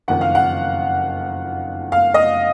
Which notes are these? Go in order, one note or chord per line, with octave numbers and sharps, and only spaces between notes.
F#1 F2 D#3 F#5
F5
F#5
F5
D#5